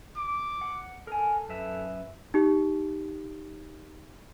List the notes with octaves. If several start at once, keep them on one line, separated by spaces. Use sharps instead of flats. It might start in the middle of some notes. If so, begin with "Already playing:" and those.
D6
F#5
A4 A#4 G#5
F#2 B4 E5
D#4 G4